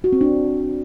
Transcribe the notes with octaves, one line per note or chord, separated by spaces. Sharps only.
F#4
C4
D4